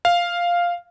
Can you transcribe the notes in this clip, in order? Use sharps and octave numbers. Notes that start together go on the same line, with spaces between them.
F5